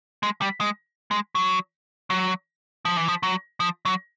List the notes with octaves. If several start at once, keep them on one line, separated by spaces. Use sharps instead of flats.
G#3
G3
G#3
G#3
F#3
F#3
F3
E3
F3
F#3
F3
F#3